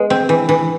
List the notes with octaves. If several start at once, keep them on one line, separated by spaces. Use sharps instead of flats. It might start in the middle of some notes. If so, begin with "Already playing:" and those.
Already playing: G#3 B3
C4
E3
E3